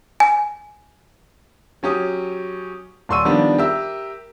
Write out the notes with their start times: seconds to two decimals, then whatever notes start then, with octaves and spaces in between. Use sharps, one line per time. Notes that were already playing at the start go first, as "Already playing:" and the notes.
0.20 G#5
1.83 F#3 C#4 G4 D#6
3.09 D#1 D5 C6 C#6 E6 D#7
3.24 D#3 F3 G3 B3 D4
3.58 G4 A#4 E5 E6